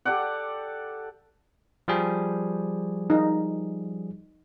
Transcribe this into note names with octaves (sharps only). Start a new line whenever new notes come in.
G4 A4 D5 F#5
F3 G3 G#4
D#4